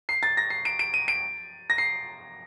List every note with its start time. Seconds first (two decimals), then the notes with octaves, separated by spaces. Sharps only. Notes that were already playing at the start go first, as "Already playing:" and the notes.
0.09 C7
0.23 A6
0.37 A#6
0.50 C7
0.65 D7
0.79 D7
0.94 D#7
1.08 D7
1.70 A#6
1.78 C7